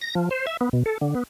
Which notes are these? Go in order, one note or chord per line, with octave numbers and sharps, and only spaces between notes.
A#6
F3
C5
E5
B3
B2
A4
D3
B3